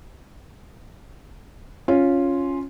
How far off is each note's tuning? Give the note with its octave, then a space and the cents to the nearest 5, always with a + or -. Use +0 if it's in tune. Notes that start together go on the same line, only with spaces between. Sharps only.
C#4 +0 F4 +0